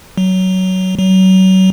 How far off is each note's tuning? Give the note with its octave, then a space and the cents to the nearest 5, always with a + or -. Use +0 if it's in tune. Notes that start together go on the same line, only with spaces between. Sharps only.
F#3 +15
F#3 +30